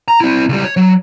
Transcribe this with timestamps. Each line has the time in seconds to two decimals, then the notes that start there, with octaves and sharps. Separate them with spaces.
0.08 A#5
0.21 C4 E4
0.49 C#2 G3
0.64 C#5
0.77 F#3